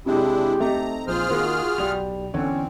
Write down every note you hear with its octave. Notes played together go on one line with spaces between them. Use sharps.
C3 G#3 D4 E4 G4
A3 C4 D#4 A#5
A#1 F4 G#4 C5 F6
D#3 A#3 F#4
B1 G3 F7
E2 D3 C4 C#4 C#5